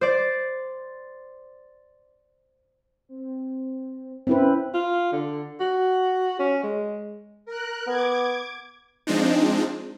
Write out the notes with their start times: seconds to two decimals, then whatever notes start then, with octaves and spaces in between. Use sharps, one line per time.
0.01 C5 D5
3.09 C4
4.27 C4 C#4 E4 B4
4.74 F4
5.12 D3
5.60 F#4
6.39 C#4
6.63 G#3
7.45 A#4 F#6
7.87 B3 D6 G#6
9.07 F3 G#3 C4 D4 D#4